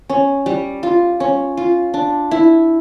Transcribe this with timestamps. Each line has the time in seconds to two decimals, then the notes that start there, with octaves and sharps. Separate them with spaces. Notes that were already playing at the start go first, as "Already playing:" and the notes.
0.10 C#4
0.46 G3
0.83 F4
1.20 C#4
1.57 F4
1.94 D4
2.31 E4